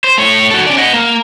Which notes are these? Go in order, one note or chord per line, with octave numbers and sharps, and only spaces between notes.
C5
A3 C#5
F#4 A4
C#4 D5
D#5 F#5
A#3